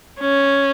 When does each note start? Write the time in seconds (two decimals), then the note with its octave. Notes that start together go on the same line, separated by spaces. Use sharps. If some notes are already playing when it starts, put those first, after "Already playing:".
0.20 C#4